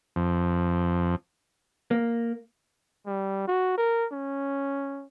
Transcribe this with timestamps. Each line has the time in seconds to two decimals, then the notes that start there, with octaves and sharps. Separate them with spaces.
0.16 F2
1.91 A#3
3.06 G3
3.48 F#4
3.78 A#4
4.12 C#4